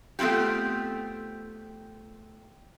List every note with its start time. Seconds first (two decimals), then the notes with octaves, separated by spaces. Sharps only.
0.19 A3 B3 C4 F4 G4